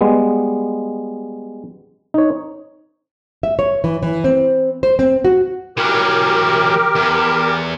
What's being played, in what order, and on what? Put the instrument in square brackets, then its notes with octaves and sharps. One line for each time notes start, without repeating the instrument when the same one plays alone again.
[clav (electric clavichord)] G3 G#3 B3
D#4 C#5
[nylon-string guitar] E5
C#5
E3
E3
C4
C5
C4
F#4
[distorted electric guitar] E3 F#3 [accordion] G4 A#4
[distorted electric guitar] E2